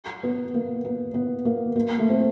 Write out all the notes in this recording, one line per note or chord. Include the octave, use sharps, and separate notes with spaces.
B3
A#3
B3
B3
A#3
A#3
A3
C4